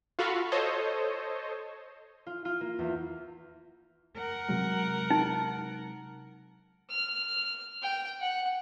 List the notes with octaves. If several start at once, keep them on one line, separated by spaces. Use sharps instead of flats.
F4 F#4 A4 F5 B5 C#6
A4 C5 C#5 D#5
F4
F4
A#3
E2
A#4 F#5
C3 F#3 G#3
D#4
F6
G5
F#5